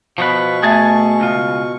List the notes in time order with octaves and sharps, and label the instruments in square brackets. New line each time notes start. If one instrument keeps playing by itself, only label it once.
[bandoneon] B2 C#6 [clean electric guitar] F3 B3 B4
[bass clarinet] A3 [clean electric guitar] G#4 G#5 A5
[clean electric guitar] C#2 F4